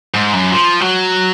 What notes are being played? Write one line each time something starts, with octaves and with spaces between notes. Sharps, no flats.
G#2
F#2
F3
F#3